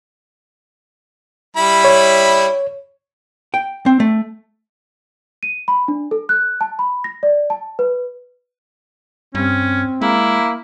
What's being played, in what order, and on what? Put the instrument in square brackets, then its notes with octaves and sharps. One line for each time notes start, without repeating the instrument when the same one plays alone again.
[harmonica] G3 E4 B5
[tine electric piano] C#5
[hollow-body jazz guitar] G5
C4
A3
[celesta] D#7
B5
D4
A4
F#6
A5
B5
A#6
D5
A5
B4
[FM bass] G2 [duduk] C4 [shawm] C#4
[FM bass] G#3 [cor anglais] A#3 [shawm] E4